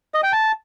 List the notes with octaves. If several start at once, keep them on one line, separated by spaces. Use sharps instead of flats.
D#5
G5
A5